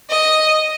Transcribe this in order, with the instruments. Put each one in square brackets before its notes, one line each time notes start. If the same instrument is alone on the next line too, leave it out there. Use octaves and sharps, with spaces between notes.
[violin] D#5